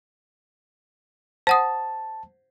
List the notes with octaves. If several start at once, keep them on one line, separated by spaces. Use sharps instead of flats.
C5 F#5 A5 D#6